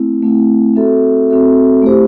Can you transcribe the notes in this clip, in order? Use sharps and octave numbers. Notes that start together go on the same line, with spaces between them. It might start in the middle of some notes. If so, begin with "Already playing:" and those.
Already playing: A3 C4 E4
A3 C4 E4
C4 F#4 A4 E5
C4 F#4 A4 E5
A3 E4 G4 C5